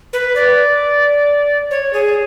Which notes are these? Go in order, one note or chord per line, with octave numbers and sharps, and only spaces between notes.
B4
D5
C#5
G#4